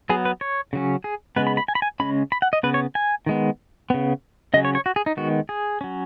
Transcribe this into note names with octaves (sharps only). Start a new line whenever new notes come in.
F#3 B3 G#4
B4
C#5
C#3 F#3 C#4
G#4
C#3 G#3 B3 B4
B5
B5
G#5
B5
G#5
C#3 G#3 C#4 B5
B5
F#5
D#5
C#3 B3 B4
C#5
G#5
D#3 G#3 B3
C#3 B3
C#3 F#3 C#4 D#5
C#5
C#5
F#4
G#4
D#4
D#3 G#3 B3 F#4
G#4
F#3 C#4